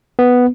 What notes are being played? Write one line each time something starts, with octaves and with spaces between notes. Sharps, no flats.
B3